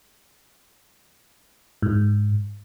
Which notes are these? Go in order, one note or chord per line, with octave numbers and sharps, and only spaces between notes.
G#2